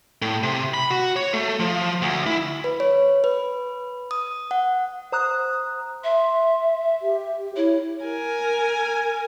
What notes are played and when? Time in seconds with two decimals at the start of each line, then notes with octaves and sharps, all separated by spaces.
0.22 A2
0.43 C3
0.74 B5
0.90 F#4
1.16 C#5
1.34 A3
1.60 F3
2.02 D2
2.26 E4
2.64 B4
2.80 C#5
3.24 B4
4.11 D#6
4.51 F#5
5.12 C5 A#5 D#6 F#6
6.03 E5 C6
7.02 G4
7.56 E4 C#5
8.04 A#4 G#5